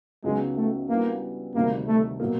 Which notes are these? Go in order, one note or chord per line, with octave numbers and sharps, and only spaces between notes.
C#2 C#3 F#3 G#3 B3 D#4
A3
E3 G3 A#3 B3 D4 F#4
D2 C3 D#3 G3 A#3
A3
B2 F#3 A#3